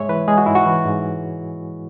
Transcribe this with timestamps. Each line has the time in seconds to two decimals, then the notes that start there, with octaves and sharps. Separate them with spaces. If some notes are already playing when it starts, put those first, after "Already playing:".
Already playing: G#2 G#3 C#5 E5
0.09 E3 B4
0.28 G#3 G#4
0.38 F#4
0.46 G#2 E4
0.55 F#4
0.66 E3
0.85 G#2